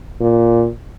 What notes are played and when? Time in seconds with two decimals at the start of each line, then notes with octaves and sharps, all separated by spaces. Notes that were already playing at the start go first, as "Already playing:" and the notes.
0.21 A#2